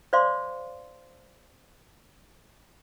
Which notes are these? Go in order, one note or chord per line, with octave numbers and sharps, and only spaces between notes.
C5 D5 F5 C6 D6